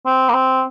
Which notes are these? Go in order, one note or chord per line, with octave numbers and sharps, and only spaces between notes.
C4
A#3
C4